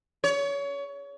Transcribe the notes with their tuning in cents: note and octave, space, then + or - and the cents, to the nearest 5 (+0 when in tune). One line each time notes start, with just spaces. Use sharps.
C#5 +25